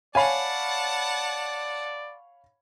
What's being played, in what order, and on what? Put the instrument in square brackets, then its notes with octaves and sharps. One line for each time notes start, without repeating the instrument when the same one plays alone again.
[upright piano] C#5 F5 B5 [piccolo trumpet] D5 [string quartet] F#5 A5 [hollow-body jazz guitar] G#5